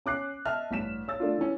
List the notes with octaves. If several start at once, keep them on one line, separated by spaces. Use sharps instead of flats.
C#4 D6 F#6 C7
D#5 E5 A5 F6
A1 G2 B6 E7
C#5 E6 A6
A3 D4 F4
E3 C#4